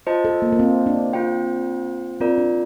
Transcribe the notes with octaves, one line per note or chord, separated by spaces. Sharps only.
F4 C5 D#5 A5
A4
A#3
A#3
C4
D4
C4 F4 C5 G5
C4 F4 A#4 D5
D4